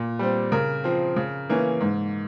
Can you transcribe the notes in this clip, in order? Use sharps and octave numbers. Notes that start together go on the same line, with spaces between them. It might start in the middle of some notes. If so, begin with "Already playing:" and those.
Already playing: A#2
G3 C4
C#3 A#4
F3 C4
C#3
E3 A#3 C#4
G#2